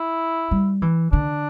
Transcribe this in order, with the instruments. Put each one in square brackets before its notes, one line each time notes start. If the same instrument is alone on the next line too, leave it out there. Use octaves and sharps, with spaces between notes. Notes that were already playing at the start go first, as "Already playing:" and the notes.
Already playing: [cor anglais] E4
[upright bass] G3
E3
[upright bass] D3 [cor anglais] D4